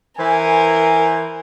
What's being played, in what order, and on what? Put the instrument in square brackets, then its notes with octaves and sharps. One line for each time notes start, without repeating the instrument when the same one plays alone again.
[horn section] E3 C5 G#5 [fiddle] A#4